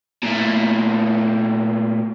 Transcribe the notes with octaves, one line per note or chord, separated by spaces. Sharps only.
A#2 A3